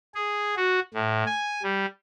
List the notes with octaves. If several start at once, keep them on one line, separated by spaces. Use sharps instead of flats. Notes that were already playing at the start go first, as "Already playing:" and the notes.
G#4
F#4
A2
G#5
G3